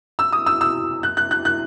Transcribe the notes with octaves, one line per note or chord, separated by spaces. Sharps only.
E6
D#6
E6
E6
F#6
F#6
F#6
F#6